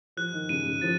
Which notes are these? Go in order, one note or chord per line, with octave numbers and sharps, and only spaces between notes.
F3 F#6
D#3
C#3 D#7
C#3
F3 A6